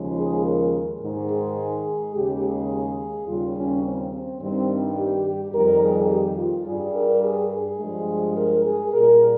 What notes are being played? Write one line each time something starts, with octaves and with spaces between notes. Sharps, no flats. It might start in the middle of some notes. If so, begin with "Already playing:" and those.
Already playing: D#2 C#3 F3 G#3
G#4
A#4
G#2 D#3 G#3
G#4
D#2 C#3 G#3 G4
G#4
D#2 C#3 G3 F4
C#4
C4
C4
G2 D#3 G3 C4
G4
G4
F2 D#3 G3 A#4
G#4
G4
F4
G2 G3 G#4
A#4
G#4
G#4
G2 F3 G#3
A#4
G#4
A#2 G3 A#4